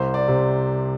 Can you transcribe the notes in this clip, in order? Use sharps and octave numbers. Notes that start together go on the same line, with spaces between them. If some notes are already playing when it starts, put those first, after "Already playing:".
Already playing: C2 C5
D5
C3